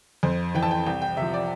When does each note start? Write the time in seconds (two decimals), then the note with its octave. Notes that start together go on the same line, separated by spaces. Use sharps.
0.23 F2 C5
0.55 E3 G5
0.63 A5
0.71 G5
0.86 C2 G5
1.02 G5
1.17 C3 F3 E5
1.34 D5